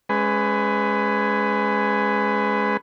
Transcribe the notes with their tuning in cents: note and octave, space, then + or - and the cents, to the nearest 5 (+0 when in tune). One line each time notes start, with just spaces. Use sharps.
G#3 +0 C#4 +0 B4 +20